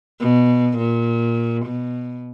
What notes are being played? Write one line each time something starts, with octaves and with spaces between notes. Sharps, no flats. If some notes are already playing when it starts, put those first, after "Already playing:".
B2
A#2
B2